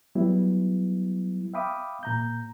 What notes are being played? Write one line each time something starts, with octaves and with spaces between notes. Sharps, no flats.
F#3 G3 B3 E4
E5 F5 G5 B5 D6 D#6
A#2 A#5 G6